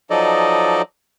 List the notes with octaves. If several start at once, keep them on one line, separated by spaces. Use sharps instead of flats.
F3 F#3 D#4 A4 D5 D#5